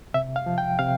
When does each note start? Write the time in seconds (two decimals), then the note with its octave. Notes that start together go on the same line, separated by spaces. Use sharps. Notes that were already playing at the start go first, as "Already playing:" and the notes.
0.14 C3 E5
0.36 F5
0.46 F3
0.58 G5
0.79 C3 F5